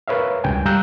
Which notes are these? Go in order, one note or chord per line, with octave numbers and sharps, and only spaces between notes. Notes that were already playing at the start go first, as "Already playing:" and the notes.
A#4 B4 C#5 E5 F5
C#2 G2 G5 G#5
G3 F5 A#5 E6 F#6 G6